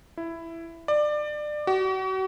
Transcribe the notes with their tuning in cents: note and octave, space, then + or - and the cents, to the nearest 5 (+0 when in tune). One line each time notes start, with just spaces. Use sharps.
E4 +10
D5 +25
F#4 +40